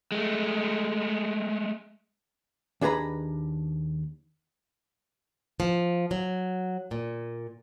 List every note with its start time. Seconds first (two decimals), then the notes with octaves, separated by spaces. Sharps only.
0.12 G#3 A3
2.81 D#2 D4 G#4 B4 A#5 B5
5.60 F3
6.11 F#3
6.91 A#2